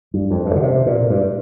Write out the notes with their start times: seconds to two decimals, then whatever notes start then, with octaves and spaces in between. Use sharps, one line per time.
0.14 G2
0.31 F2
0.46 G2
0.56 D3
0.62 C3
0.86 A#2
1.10 G2